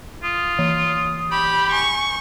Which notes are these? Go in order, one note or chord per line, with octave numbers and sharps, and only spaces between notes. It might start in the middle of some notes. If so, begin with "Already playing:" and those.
F4 D#6
E3
G4 B5
G#5 C#6